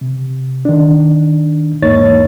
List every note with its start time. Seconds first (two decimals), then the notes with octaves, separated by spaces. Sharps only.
0.01 C3
0.65 D#3 D4
1.82 E2 G#2 A#3 D#4 C#5 A6